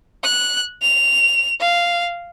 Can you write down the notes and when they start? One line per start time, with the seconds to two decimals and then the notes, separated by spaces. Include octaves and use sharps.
0.24 F#6
0.82 F7
1.60 F5